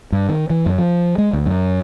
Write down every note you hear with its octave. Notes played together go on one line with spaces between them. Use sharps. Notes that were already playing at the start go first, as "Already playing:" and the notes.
G2
D#3
E3
F#2
F3
G#3
D2
F#2